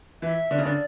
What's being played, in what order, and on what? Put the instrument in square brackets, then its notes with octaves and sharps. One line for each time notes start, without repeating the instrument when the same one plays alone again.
[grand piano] E3 [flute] E5
[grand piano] D3
C#3
[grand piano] D3 [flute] D5